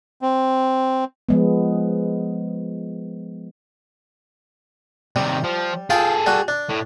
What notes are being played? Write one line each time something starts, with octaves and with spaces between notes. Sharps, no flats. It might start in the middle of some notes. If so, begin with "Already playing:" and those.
C4
F3 G#3 B3
C3 D#3 G3
F3
F4 G#4 A4 G5
G3 F#4
D4
A2